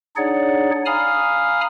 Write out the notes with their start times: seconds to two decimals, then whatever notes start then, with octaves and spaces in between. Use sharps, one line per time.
0.16 D4 D#4 G#4 C#5 D5 F#5
0.86 F5 G#5 A#5 B5 D#6 F6